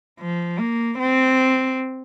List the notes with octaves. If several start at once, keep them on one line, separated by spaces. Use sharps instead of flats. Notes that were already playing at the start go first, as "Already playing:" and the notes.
F3
A#3
C4